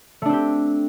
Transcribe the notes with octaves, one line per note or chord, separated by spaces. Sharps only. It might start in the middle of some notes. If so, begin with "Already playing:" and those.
A3 C4 D4 G4